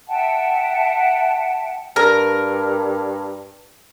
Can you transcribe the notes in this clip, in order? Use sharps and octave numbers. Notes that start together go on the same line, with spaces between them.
E5 F#5 G5 A5
G2 A#4